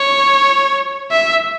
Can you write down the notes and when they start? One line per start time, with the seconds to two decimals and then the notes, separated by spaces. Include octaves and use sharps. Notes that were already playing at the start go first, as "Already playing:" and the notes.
Already playing: C#5
1.11 E5